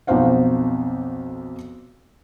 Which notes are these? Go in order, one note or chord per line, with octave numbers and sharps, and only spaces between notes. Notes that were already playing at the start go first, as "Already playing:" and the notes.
B1 F2 D#4 C5 F5 F#5